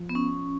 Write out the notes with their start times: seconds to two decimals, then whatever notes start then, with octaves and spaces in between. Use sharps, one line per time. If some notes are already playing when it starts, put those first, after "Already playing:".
Already playing: F3
0.09 B3
0.15 C#4